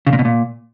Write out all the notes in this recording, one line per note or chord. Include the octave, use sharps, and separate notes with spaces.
C#3
A#2
B2
A#2